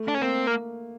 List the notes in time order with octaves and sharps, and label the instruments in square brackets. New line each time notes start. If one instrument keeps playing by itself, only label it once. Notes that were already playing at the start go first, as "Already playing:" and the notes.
Already playing: [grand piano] A3
[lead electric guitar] D4
C#4
[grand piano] A3
[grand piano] A#3 [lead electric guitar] C4
[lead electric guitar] A#3